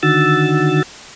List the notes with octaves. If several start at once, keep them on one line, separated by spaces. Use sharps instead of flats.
D3 D#3 F#4 E6 A6